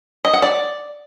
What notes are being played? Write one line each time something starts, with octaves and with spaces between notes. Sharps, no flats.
D#5
F#5
D5